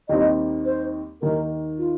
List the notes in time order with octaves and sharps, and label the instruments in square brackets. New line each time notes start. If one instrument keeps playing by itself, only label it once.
[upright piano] D#2 D#3 G3 C4 D#4 [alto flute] D#5
[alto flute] C5
[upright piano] D#2 D#3 A#3 D#4 [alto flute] A#4
[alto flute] F4